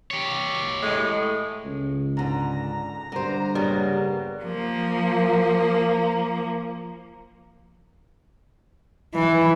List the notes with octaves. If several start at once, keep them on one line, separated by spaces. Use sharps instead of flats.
G4 C#5
A2 G#3 A3
C#2
G#2 D3 A#5
G2 D3 C5
C#3 G3 A#3 B3
F3 A#3
E3